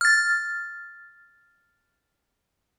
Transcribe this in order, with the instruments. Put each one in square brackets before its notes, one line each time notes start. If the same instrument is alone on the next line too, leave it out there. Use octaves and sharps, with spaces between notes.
[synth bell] F6 A6